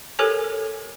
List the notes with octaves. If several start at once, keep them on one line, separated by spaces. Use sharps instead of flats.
G4 A4 A#4 C#5 G#5